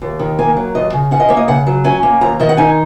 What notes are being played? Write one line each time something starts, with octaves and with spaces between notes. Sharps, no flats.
D#2
D#3
A#3 G#5
F#3
D#2 D#5
C#3
C#4 F#5
D#5
A#3 C#5
D#5
C#3 F#5
F#3
C#4 G#5
A#3
D#2 A#5
D#3 D#5
F#5
D#4 G#5